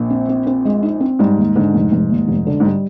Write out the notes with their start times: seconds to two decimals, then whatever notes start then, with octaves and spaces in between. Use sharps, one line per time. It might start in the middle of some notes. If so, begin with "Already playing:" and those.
Already playing: A#1 A#2
0.10 C4
0.29 C4
0.47 C4
0.65 G#3
0.83 D#4
1.00 C4
1.19 G#2 G3
1.37 D#2
1.55 G#2 D3
1.74 F1
1.92 F1
2.10 D#2
2.28 F1
2.47 D3
2.60 G#2
2.65 G3